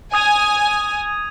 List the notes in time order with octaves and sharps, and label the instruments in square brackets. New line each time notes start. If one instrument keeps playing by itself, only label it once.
[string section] G#5 [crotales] D#6 G#6 D#7